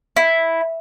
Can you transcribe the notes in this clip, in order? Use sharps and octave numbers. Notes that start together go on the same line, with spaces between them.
E4